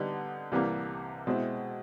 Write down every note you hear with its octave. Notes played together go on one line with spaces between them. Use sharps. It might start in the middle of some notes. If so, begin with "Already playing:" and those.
Already playing: D3 G3 B3 D#4
C2 C3 E3 G3 A#3
B2 G#3 C4 E4